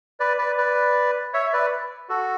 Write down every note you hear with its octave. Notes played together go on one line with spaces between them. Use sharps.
B4 D5
B4 D5
B4 D5
C#5 E5
E5
B4 D5
F#4 A4